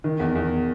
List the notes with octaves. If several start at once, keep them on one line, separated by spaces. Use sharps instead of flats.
D#3
E2
E2